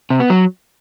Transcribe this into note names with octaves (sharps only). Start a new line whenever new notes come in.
C3
B3
F#3